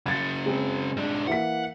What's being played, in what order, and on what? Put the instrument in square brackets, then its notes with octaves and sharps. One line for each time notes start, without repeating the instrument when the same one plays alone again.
[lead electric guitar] C#3 F#3 [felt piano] G#6 A6
[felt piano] G#3 C4
[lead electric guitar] G#2 D4
[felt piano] E3 A#3 B6 [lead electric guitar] F#5